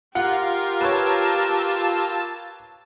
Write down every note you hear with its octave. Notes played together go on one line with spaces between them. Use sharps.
F4 G4 A#4 F#5
B4 C#5 A5 E6